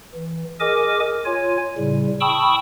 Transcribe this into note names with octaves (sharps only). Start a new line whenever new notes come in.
E3
G#4 A#4 D#5 G#5 D6
F4 C#5 G#5
A2 C#3 G3
G5 A5 B5 C#6 D#6 E6